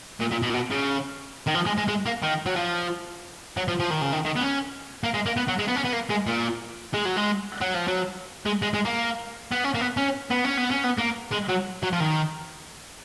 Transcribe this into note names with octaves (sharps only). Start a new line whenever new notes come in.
A#2
A#2
B2
A#2
B2
C#3
D#3
F3
G#3
G#3
G#3
A#3
D#3
F#3
F3
F#3
F3
F3
D#3
C#3
D#3
D#3
B3
C#4
A#3
G#3
A#3
B3
F#3
G#3
B3
C#4
B3
A#3
G#3
A#2
G#3
F#3
G#3
F#3
F3
F#3
G#3
G#3
G#3
A#3
B3
C#4
A#3
B3
C#4
B3
C#4
B3
C#4
B3
A#3
G#3
F#3
F#3
F3
D#3